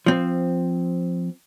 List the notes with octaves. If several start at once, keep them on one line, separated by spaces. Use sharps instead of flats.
F3 C4